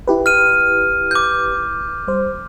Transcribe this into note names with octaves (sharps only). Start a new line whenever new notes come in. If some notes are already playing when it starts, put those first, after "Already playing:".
E4 G4 B4
F6 D#7
D6 G6
G3 C5